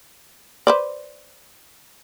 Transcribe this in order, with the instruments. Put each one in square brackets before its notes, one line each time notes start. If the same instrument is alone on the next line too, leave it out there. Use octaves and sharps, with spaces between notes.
[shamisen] B4 C5 D5